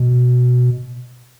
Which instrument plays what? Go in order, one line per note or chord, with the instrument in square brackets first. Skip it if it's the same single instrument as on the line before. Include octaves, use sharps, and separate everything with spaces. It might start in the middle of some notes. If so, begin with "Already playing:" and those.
Already playing: [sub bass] B2